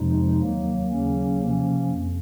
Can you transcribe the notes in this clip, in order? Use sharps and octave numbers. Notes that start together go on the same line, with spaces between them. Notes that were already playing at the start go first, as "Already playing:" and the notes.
Already playing: F2 C3 F3 G#3 D#4
D#2 D#3 F#3 A#3
D#2 C#3 F#3 A#3 C#4
C3 F3 A#3 C#4
F2